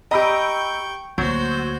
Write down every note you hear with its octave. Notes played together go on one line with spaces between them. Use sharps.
G4 D#5 G5 A#5 B5 C#6 E6
D2 F#3 A#3 F#4 C5 G6